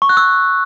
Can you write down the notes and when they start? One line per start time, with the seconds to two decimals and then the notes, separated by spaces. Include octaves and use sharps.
0.02 C#6
0.09 F#6
0.17 E6